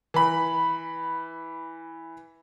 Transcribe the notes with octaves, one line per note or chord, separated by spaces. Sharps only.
E3 B5